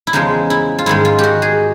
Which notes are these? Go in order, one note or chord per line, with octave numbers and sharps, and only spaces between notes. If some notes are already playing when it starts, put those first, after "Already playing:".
E4
E2 C#3 F3 G#3 D#4
E4
F4
G#2 D#3 G#3 E4
F4
F#4 G4
G#4